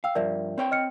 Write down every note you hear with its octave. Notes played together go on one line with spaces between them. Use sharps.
F5 G5 E6
G2 F3 A#4 D5 E5
C4 C#5 G5
D#5 F6 C#7